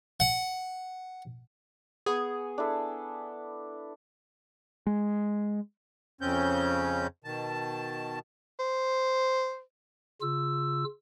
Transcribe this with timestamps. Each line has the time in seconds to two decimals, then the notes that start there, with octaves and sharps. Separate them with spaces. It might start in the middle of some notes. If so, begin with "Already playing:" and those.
0.20 F#5
2.06 B3 G#4 C#6
2.58 D4 E4 A4
4.87 G#3
6.21 F2 C#3 C4 C#4 G6
7.24 B2 D#3 A5
8.60 C5
10.21 C#3 F4 E6